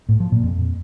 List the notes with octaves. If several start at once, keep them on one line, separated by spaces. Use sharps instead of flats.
A2
F3
A#2
F2